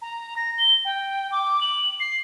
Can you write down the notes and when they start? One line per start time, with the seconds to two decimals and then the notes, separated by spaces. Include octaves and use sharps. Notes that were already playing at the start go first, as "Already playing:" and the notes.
0.02 A#5
0.36 A#6
0.58 G7
0.85 G5
1.32 D6
1.61 F#7
2.00 C7